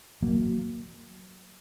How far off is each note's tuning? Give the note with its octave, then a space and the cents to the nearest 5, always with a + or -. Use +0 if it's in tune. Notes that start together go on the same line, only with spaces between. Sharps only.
F#3 +0 A#3 -5